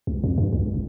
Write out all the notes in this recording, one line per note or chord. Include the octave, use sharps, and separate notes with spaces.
C#2
F2
G2
C#2
E1